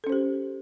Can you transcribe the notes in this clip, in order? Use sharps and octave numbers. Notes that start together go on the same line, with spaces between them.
C#4 G4 A4 C5